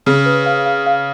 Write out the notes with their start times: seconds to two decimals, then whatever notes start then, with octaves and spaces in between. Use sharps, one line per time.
0.06 C#3 G#4
0.26 B4
0.46 F5
0.66 F5
0.86 F5